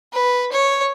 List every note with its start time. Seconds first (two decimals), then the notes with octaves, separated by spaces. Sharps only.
0.13 B4
0.52 C#5